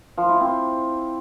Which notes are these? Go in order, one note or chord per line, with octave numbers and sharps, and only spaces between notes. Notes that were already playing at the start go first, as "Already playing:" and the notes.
F3
E4
C4